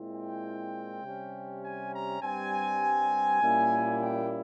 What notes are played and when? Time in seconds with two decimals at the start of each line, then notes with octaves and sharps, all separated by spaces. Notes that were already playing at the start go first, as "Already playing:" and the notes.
Already playing: A#2 G#3 C4 E4
0.14 G5
1.03 C3 G3 C#4
1.63 G#5
1.92 A#5
2.22 G2 G3 C4 G#5
3.41 A#2 G3 A#3 C#4 E4
4.01 G5